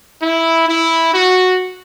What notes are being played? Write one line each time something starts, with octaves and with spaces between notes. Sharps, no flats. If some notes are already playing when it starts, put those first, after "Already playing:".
E4
E4
F#4